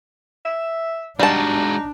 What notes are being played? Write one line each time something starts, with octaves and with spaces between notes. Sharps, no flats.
E5
G3 G#3 D4 D#4 F#4 A5